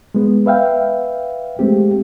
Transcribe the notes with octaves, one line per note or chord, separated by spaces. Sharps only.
G#3 B3
B4 E5 F5 G5
G#3 A3 C4 G4